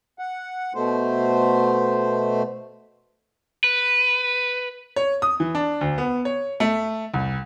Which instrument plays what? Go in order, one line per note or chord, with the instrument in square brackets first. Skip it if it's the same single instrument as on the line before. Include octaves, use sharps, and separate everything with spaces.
[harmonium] F#5
B2 A3 C5
[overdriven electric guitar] B4
[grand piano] C#5
D#6
E3
D4
D2
B3
C#5
A3
C2